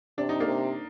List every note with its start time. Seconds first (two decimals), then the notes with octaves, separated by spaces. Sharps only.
0.18 C3 D4
0.29 D#4
0.40 A#3 D4
0.47 C3